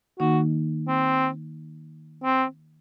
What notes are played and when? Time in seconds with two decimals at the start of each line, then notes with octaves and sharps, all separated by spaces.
0.20 D#3 A#3 D#4 F#4
0.88 C4
2.24 C4